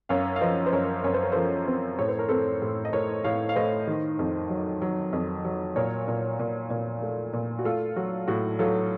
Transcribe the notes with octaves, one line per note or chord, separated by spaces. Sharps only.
F#2 C#5 F5
F5
F3 C5 D#5
C5
F#2 A#4 C#5
F#2 C#5
C5
A#4
F3 A4 C5
C4
A2 C#5
C5
A#4
C4 A4 C5
A2
D#5
A2 A#4 C#5
A2 C#5 F5
F5
A2 C5 D#5
D#3
F2
F#3
F#3
F2
F#3
A#2 A#4 C#5
A#2
A#2
A#2
A3
A#2
F#4
A3 F4 A4
F#3 F#4
A2 F#4
F#3 F4 A4